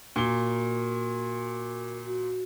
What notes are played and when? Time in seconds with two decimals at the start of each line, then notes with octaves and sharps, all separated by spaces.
0.16 A#2 F#4 A#4 C#6 G7
2.06 F#4